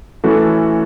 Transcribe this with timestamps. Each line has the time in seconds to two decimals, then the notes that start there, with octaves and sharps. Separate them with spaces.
0.24 E3 A3 C#4 F#4 A4